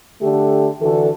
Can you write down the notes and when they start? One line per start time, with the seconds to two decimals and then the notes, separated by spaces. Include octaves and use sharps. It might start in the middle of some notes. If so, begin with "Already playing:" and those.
0.21 D3 A3 G4
0.81 D3 E3 D4 F#4 A4